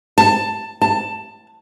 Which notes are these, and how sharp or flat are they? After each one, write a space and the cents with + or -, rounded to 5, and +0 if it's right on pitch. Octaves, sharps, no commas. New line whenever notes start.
A5 +10
A5 +10